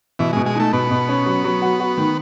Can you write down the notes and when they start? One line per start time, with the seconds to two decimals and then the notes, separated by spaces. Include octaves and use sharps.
0.19 B2 E3
0.33 B2 G#3
0.46 G#3
0.56 A3 D#4
0.73 B2 B3
0.91 B2
1.09 C#4
1.26 F#3
1.44 F#3
1.62 F#4
1.80 F#4
1.97 D#3